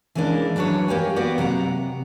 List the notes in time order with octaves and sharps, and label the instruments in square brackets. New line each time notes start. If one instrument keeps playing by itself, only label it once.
[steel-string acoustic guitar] E3 G#3 A#3 C#4 D4 E4
E3 F#3 D4 B4 C#5
A#3 G4 C#5 G#5
A#3 B3 F#4 G4 D5
C3 F#3 F#5 A#5